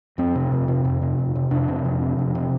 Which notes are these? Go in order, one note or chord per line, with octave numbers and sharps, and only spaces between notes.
F2 C4
C3
F2
C3
F2
C3
F2
C3
F2 D4
C3
F2
C3
F2
C3